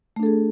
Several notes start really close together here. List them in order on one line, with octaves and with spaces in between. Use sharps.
A3 D4 A4 G#4